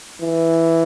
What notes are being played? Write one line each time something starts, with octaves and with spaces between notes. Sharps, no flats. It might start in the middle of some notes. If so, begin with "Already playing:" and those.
E3